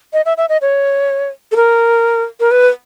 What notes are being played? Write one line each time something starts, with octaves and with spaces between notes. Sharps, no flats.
D#5
E5
E5
D#5
C#5
A4
A#4
A#4
B4